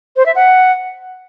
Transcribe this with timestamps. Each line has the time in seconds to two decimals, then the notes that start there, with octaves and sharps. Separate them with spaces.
0.16 C5
0.26 E5
0.35 F#5